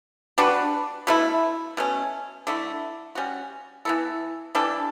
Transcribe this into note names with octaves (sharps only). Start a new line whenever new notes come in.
G3 D4 F#4 B4
B2 A3 E4
B2 A3 C#4
D3 A3 E4
G3 C#4 F#4
E3 B3 E4 A4
E3 G3 D4 A4